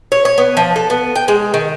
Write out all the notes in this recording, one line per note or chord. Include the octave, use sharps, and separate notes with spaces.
C#5
C#5
B3
F3
A4
B3
G5
G#3
D#3